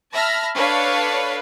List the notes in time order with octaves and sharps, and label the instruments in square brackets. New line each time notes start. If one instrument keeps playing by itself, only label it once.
[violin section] E5 A5 B5 F6 A#6
D4 A4 B4 C#5 F5